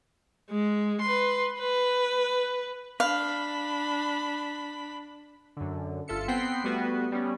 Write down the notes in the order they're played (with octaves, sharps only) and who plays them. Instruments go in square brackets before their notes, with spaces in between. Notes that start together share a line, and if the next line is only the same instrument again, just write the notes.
[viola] G#3
B4 C6
B4
[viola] D4 B5 [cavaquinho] F5
[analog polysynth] F#2 D3
G1 F4 A4 E5 C#7
B3 C4 F#5 G5 B6 C7
G3 A3 B3 F#4 B4
G3 B3 C#4